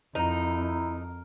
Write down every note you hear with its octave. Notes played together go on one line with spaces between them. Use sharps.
F2 D#4 E4 A#4